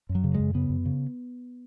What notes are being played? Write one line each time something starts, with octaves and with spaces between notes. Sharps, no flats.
F#2
F#3
C#3
G#3
F#2
C#3 B3
F#2
C#3